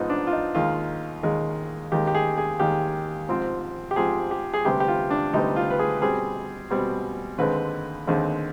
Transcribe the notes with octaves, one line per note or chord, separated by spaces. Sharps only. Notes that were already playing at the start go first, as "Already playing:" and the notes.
Already playing: G#2 F3 B3 D#4
D4
F4
D#4
D#2 D#3 G#3 F4
D#2 D#3 G#3
D#2 D#3 G#3 G4
G4
G#4
G#4
D#2 D#3 G#3 G4
G#2 F3 C4
G4
G#2 F3 C4 G#4
G4
G#4
D2 C3 G3 B3 G4
G4
F4
D4
D2 C3 G3 B3 D#4
F4
B4
G#4
B2 G3 C4 G#4
B2 G3 C4
D#2 D3 G#3 C4 B4
D#2 D3 G#3 C4